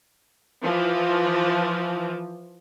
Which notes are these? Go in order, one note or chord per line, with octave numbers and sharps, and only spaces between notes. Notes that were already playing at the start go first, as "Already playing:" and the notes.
E3 F3